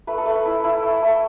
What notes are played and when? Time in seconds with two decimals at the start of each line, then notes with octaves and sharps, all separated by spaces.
0.07 A3 B4
0.18 A4
0.26 A3 B4
0.46 E4
0.64 E4
0.83 A3
1.02 A3